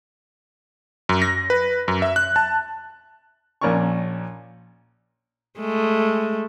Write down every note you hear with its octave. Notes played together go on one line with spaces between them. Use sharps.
F#2
A#6
B4
F#2
E5
F#6
A5
A#1 C#4 A#4 D5 C#6
G#3 A3